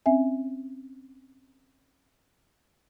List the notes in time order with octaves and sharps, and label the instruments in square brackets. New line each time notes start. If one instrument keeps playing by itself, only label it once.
[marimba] C4 C#4 E5 G#5